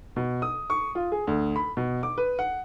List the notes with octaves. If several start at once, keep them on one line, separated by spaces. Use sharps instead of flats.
B2
D#6
C#6
F4
G#4
D2
B5
B2
D6
B4
F#5